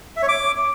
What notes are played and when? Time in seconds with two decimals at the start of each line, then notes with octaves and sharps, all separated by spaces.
0.16 E5
0.22 C#5
0.28 D6